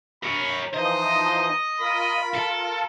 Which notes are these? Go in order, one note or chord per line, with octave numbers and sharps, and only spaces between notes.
A#4 C#5 B5
E3 F3 D#4 C5 D#5
F4 A#4 B5
A4